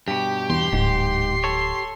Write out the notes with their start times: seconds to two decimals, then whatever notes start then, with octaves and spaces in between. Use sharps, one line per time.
0.08 G2 B2 G4
0.50 E2 C6
0.73 D1 G#2
1.44 A4 C#5